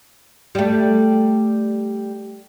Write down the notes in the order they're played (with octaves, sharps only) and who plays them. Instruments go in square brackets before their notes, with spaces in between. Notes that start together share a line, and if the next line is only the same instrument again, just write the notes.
[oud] G3 A3